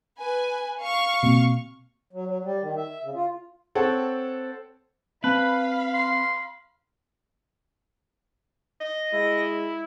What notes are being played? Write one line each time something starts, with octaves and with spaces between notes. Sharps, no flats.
B4 G#5
F5 C#6 F6
B2 A#3 C4
F#3
F#3
G3
D#3
E5
C#3
F4
C4 A4 C#5 F#5 G5
C4 B4 F5 A5 B5
C6
D#5
G#3 E4